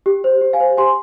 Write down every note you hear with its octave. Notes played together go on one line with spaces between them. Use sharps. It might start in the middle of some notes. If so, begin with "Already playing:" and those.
G4
C5
G4
F5 G#5
C5
G4 G#5 C6